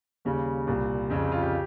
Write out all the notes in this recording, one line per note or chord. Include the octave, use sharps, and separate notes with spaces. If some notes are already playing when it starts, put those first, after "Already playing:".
D#2 C#3 G3
C2 A#2 G3
F2 C#3 G3
G4
F4
G4